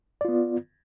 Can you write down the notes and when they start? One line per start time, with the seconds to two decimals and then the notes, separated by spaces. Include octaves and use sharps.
0.21 D5
0.25 F4
0.28 B3